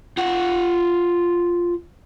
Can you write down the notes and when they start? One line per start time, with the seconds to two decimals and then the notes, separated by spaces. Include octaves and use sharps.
0.17 F4 F#5